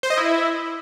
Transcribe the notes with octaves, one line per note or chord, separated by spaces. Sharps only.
C5
D#5
E4